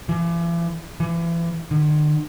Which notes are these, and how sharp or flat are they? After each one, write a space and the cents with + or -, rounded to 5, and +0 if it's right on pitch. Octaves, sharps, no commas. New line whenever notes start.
E3 +45
E3 +35
D3 +45